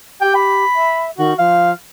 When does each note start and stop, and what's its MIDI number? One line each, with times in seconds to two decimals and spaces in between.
0.21 0.65 67
0.21 0.32 79
0.35 1.06 83
0.75 1.11 76
1.18 1.33 51
1.18 1.33 66
1.39 1.73 53
1.39 1.71 77